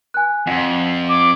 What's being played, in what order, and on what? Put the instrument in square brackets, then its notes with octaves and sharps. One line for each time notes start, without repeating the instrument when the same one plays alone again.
[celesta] G#5 F#6
[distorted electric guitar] F2 [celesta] F#5
[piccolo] D6